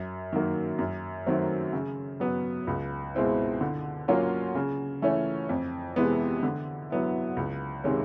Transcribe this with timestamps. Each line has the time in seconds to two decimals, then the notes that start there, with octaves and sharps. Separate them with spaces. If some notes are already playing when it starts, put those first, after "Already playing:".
Already playing: F#2
0.33 D#3 F#3 A#3
0.79 F#2
1.26 D#3 F#3 A3 C4
1.73 C#3
2.20 F#3 B3
2.67 C#2
3.15 B2 G#3 C4 E4
3.61 D3
4.08 F#3 A#3 C#4 F4
4.55 C#3
5.02 E3 A3 C#4
5.49 F2
5.96 C3 E3 G#3 B3
6.43 D3
6.90 F#3 B3 E4
7.37 C#2
7.84 C3 D#3 G#3 C#4